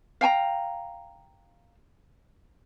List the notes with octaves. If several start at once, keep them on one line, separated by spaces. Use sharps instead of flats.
F5 G5 G#5 A#5